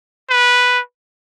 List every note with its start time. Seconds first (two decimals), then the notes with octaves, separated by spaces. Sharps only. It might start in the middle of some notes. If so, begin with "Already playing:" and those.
0.30 B4